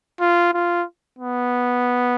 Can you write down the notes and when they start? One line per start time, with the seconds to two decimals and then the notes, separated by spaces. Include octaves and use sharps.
0.20 F4
0.54 F4
1.19 B3